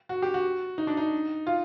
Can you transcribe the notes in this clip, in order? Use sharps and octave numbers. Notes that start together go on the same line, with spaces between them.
F#4
G4
F#4
D#4
D4
D#4
F4